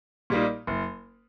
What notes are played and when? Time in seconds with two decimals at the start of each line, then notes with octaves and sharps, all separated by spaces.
0.30 A#2 G3 A#3 D#4
0.67 F#1